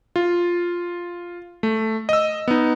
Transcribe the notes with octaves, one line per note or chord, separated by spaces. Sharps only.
F4
A3
D#5 E6
B3 D#4